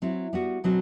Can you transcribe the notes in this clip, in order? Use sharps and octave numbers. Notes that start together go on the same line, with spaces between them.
F#3 C4 E4
G3 B3 F#4
B2 F#3 C4 F#4